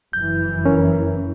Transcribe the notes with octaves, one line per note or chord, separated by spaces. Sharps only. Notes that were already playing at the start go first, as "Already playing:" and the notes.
F#1 F2 E3 G6
C#4 A#4